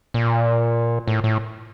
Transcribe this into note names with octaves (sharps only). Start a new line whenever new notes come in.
A#2
A2
A2